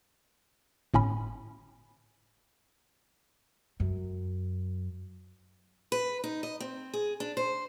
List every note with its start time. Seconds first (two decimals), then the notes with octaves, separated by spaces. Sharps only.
0.94 G1 A2 C#4 B5
3.80 F#2
5.92 B4
6.24 D#4
6.43 D#5
6.60 C4
6.93 G#4
7.20 D4
7.37 C5